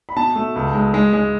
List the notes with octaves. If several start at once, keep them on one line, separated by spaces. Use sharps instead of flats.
B5
B2 A5
A3
C#2
G#3
G#3
G#3